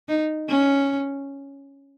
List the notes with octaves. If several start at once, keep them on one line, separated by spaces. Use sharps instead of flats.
D#4
C#4